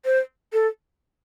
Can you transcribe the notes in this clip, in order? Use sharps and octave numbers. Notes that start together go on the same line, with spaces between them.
C5
A4